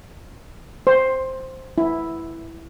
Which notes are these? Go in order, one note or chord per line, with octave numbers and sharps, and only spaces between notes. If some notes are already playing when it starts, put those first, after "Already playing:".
C5
E4